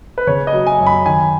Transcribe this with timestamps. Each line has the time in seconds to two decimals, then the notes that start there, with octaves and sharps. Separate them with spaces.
0.18 B4
0.27 C#3 C#5
0.47 D#5
0.53 F#3
0.66 G#5
0.80 F#2
0.87 B5
1.06 D#3 G#5